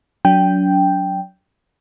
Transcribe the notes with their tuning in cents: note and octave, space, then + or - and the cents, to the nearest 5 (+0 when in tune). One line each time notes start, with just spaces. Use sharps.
F#3 +0 D4 -40 G5 +0